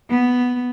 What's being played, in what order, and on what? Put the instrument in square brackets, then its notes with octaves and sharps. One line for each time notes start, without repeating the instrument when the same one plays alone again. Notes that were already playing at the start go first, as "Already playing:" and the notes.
[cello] B3